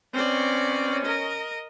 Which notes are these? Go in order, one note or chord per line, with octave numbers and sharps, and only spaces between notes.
B2 C4 C#4 D5
A#4 D#5